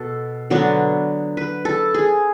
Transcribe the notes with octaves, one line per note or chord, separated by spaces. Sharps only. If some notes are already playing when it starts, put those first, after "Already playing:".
Already playing: B2 A4
D3 F#3 B3 D4
B4
A4
G#4